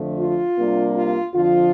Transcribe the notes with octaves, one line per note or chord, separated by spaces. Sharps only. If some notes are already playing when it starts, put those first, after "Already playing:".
Already playing: F2 D3 F3 A3
F4
C3 G3 A#3 D4
F4
F2 D3 F3 F4